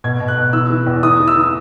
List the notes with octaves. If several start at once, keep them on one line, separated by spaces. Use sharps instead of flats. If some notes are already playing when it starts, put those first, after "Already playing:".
B2 G#6
B2
F#6
B2
E3 E6
E3
E2
E3 D#6
E3
E6
E3